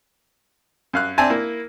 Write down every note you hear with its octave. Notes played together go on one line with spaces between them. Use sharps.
F#2 F5 F#6
C4 D4 E5 G#5 A5
A#3 E4